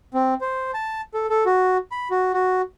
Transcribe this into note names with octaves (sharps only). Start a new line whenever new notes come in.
C4
C5
A5
A4
A4
F#4
B5
F#4
F#4